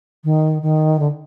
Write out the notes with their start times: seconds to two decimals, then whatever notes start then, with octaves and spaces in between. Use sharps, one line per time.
0.24 D#3
0.62 D#3
0.99 D3